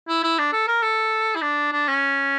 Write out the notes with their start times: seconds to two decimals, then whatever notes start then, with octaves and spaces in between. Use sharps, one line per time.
0.08 E4
0.23 E4
0.39 D4
0.53 A4
0.68 A#4
0.83 A4
1.35 E4
1.42 D4
1.72 D4
1.88 C#4